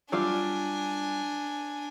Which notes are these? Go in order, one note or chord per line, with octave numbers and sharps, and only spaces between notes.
F#3 G3 D4 F4 G#5